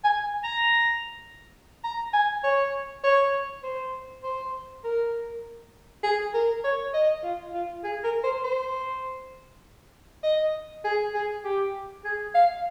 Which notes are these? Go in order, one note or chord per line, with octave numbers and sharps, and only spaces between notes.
G#5
A#5
A#5
G#5
C#5
C#5
C5
C5
A#4
G#4
A#4
C#5
D#5
F4
F4
G#4
A#4
C5
C5
D#5
G#4
G#4
G4
G#4
F5